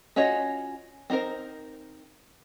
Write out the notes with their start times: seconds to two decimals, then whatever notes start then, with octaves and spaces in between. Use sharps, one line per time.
0.16 C#4 F4 F#4 C#5 D#5
1.10 C4 D#4 F#4 A#4 C5